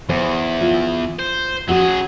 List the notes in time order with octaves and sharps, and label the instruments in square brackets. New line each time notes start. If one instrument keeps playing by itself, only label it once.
[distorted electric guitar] E2 [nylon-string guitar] C5
[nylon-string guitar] F4
[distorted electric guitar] C5
[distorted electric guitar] F#3 G#4 [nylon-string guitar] C#4 F#4 F#5